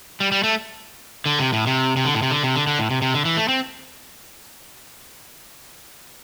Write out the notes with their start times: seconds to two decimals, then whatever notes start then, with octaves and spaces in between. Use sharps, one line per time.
0.20 G3
0.32 G3
0.44 A3
1.26 D3
1.39 C3
1.53 A2
1.67 C3
1.97 C3
2.05 D3
2.14 A2
2.22 C3
2.31 D3
2.43 C3
2.56 D3
2.67 D3
2.79 A2
2.91 C3
3.02 C3
3.14 D3
3.25 E3
3.37 A3
3.48 C4